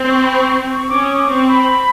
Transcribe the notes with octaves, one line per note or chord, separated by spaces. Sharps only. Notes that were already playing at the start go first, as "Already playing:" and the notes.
Already playing: C4
C#6
B5
C#6
C#6
C#6
C#4 D6
D#6
D6
C4 C#6
B5